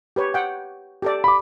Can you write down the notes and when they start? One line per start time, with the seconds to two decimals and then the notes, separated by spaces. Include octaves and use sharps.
0.16 G4 B4 C#5
0.34 F#5 G5
1.02 G4 A4 D5
1.24 B5 D6